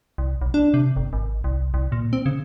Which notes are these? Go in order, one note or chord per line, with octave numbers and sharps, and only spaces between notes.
C2
B1
D4
C3
G1
G#1
C2
C2
A#2
C4
C#3